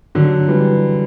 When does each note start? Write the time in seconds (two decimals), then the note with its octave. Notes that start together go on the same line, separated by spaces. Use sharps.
0.15 D3 F#3
0.48 E3 G3